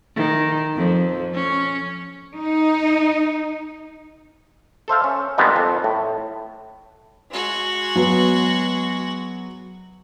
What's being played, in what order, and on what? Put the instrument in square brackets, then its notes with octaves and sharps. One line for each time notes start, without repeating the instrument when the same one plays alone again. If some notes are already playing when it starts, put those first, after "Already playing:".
[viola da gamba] D#3
F2
C#4
[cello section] D#4
[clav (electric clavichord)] A4 C5 E5 F5
C#4
D#3 F3 G3 G#3 B3 C4
F2 A4
A2
[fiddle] G#3 F#4
[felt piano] F#3 B3